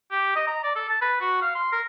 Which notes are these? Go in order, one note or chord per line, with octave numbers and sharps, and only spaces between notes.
G4
D#5
A#5
D5
A4
A5
B4
F#4
F5
C6
A#4